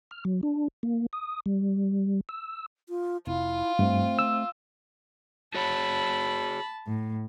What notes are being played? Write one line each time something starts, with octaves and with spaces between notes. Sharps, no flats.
F6
F#3
D4
A#3
D#6
G3
E6
F4
F1 E4 F4
G2 A3 C4
E6
F#4 G#4 C#5 A5 B5
A2